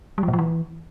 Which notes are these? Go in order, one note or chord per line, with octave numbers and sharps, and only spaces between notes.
G3
F3
A#2
F3
E3